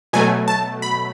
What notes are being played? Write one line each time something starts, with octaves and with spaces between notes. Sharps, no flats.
B2 F#3 A3 G#5
A5
B5